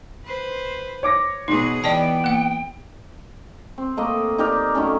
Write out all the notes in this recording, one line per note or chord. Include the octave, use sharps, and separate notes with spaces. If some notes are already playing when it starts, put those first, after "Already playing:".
B4 C5
C#5 D6 A#6
B2 D#4 F#4 G#4
E3 B3 D5 D#5 G5 A5
A#3 F#5
C4
A3 A#3 D#5
D#4 G4 A#4 D5
D#3 F#3 A3 C#4